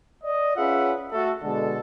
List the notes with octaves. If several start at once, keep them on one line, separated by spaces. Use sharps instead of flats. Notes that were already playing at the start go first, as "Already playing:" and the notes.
D5 D#5
C#4 F4 G#4 B4 E5 F#5
A3 F#4 A4
B2 D3 G#3 A4